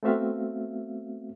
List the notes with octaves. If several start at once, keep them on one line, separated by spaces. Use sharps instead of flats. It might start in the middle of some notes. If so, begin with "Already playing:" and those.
A3 B3 C4 F#4 E5 F5